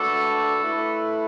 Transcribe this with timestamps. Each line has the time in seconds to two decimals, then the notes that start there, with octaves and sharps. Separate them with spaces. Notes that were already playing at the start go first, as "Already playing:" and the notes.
Already playing: A3 D4 F#4 A4 B4 D5
0.61 A3 E4 B4